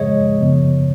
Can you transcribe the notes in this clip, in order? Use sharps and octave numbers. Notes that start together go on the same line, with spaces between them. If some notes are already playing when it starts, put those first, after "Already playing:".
Already playing: C#3 F3 G#3 G#4 C#5 D#5
F#2 C#3 F3 B3